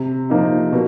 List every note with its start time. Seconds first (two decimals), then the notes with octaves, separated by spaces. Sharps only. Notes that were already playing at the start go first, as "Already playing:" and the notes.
Already playing: C3
0.30 F3 A#3 D#4
0.73 B2